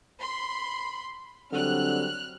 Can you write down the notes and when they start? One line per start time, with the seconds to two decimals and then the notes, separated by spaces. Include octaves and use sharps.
0.21 B5 C6
1.52 D3 F#3 G3 C4 F6 F#6